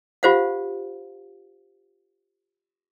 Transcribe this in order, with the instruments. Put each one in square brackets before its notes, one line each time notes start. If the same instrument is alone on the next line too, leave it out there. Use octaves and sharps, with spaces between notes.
[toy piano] F4 G4 C5 F5 F#5